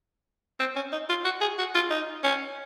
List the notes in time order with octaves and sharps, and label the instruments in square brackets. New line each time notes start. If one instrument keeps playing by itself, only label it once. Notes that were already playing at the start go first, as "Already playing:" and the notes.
[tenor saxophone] C4
C#4
D#4
F4
F#4
G#4
F#4
F4
D#4
C#4